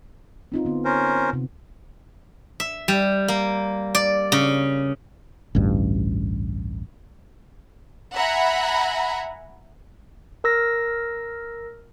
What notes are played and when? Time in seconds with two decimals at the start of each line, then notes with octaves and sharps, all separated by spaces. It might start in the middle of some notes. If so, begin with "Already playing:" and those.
0.52 C4 D#4 F4
0.65 D3 B3
0.85 C#4 A#4 C5
1.33 C3
2.60 E5
2.88 G3
3.28 A#3
3.95 D5
4.32 C#3
5.55 A1 D2 G2
8.14 E5 F#5 G#5 A#5 B5
10.44 A#4 E6 A#6